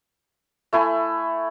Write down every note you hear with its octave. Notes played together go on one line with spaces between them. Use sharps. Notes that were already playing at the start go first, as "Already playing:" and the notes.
A3 E4 G#5 B5